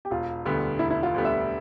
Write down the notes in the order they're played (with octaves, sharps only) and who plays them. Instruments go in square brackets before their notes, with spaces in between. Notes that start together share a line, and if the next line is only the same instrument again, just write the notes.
[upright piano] G4
[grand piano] E1 [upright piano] F4
[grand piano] D2 D3 G3 B3
[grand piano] E1 [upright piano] E4
[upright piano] E4
F4
[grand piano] D2 D3 G3 B3
[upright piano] E5